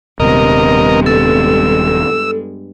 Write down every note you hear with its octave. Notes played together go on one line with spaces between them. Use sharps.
D#1 G2 C3 G#3 B3 A#4 D#5
A4 E6